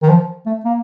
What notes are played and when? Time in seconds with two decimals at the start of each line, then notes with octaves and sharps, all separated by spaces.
0.03 D#3
0.09 F3
0.46 A3
0.65 A#3